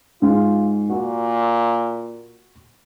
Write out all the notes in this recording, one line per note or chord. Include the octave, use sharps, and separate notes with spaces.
G#2 F4
A#2 F#4